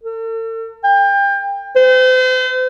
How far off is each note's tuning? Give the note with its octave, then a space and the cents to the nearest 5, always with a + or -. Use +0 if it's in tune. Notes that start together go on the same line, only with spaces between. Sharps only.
A4 +45
G5 +30
C5 -40